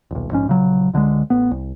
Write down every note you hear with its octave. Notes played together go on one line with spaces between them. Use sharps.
D#1 B1
A#1 G#2 C#4
A#1 C#3 F#3
C#2 D3 F#3 G#3
A1 B3
C2